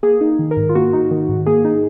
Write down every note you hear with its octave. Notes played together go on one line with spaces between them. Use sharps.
A#3 G#4
D#4
D#3
A#4
G#2
F4
A#3 F#4
D#4
D#3
G#2
A#3 G#4
D#4